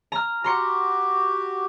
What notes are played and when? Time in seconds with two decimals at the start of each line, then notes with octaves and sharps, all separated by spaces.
0.12 A#5 F6
0.44 F#4 G4 A#5 C6 C#7